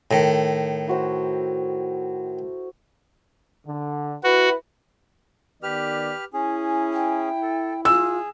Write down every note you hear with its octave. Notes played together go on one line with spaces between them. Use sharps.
A2 D#3 A4
E4 F#4 C5
D3
E4 F#4 B4
D#3 B3 G4 B4 D5 F6
C#4 E4 G#4
G5
A4
F4 G#4 E6